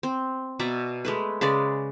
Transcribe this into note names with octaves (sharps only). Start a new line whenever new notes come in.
C4
B2 D5 E5 A#5
G#3 A3 B4
C#3 G#3 B4 D5